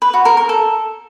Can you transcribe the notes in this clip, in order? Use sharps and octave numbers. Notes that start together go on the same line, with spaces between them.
B4
F#4
A#4
A#4
A4